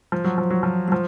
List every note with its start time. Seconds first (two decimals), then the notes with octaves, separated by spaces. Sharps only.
0.12 F3
0.24 F#3
0.38 F3
0.50 F#3
0.63 F3
0.88 F#3
0.92 F3